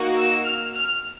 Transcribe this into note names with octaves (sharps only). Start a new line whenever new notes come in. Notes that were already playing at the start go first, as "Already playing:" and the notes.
Already playing: A#3 D#4 F#4
E6
F6
F6